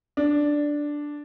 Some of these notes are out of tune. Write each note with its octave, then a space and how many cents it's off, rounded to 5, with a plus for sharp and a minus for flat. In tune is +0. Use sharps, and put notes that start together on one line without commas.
D4 +0